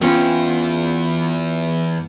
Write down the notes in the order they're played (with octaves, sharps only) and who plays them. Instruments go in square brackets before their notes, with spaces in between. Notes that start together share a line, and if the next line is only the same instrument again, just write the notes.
[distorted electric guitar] E2 [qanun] C4 C#4 F4